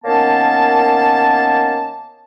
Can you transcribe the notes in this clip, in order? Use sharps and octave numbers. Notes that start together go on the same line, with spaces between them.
D#3 A#3 B3 C#4 C#5 A5